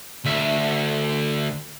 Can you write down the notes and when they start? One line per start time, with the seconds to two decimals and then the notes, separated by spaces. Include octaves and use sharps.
0.25 D2 E5